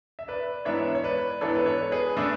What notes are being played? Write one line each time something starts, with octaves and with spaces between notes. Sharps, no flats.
E5
B4 D5
G#2 E3 B3 D4 C#5 E5
C#5
B4 D5
G#2 E3 B3 D4 A4 C#5
B4
A4 C#5
G#4 B4
D3 A3 D4